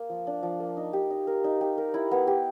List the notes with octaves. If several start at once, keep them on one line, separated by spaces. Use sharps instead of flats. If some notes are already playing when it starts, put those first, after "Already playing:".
Already playing: A#3
F3
D4
F3
A#3
D#4
G4
D#4
A#4
D#4
G4
A#4
E4
B3
G4